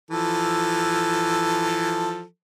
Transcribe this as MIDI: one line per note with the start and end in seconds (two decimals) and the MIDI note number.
0.11 2.24 52
0.11 2.24 53
0.11 2.24 69